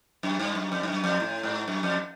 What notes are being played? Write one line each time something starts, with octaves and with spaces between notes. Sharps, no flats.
F#2
G2
F#2
F2
G2
F#2
F2
A2
G#2
F#2
F2